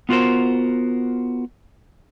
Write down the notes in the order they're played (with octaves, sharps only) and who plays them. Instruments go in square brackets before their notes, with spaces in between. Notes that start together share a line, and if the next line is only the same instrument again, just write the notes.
[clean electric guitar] B3 F4 F#4 A#4 C5